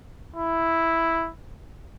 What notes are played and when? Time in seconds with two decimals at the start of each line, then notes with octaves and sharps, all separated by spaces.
0.36 E4